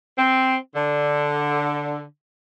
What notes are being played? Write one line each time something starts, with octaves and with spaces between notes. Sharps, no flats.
C4
D3